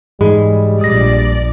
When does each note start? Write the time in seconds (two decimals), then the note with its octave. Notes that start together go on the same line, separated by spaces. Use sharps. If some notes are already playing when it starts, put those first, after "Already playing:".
0.21 G#2 E3 G3 G#3 B5
0.81 A#1 D5 D#6 A#6